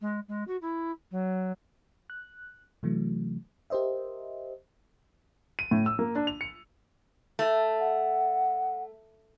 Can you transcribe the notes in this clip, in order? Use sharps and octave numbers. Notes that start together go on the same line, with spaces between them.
G#3
G#3
F#4
E4
F#3
F#6
C3 E3 F#3 A3
G4 A#4 C5 D#5 E5
D#7
A2
E6
A#3
D4
F7
C#7
A3
F#5